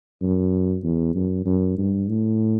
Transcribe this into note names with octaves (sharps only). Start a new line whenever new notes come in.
F#2
E2
F#2
F#2
G2
A2